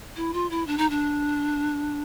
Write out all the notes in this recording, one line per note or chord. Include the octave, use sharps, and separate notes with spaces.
E4
F4
E4
D4
D#4
D4